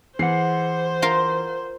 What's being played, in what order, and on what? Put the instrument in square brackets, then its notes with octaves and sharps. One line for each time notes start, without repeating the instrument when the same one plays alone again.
[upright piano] E3 C7 [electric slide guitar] G#4 F#5 [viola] C5
[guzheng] F4 A#4 F5